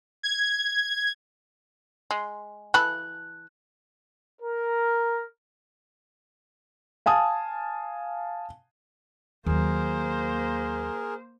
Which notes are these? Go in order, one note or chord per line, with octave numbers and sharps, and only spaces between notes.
G#6
G#3
E3 A4 B5 F#6
A#4
F5 G#5 A5 D#6
D#2 F#3 A#3 G#4 A#4 C5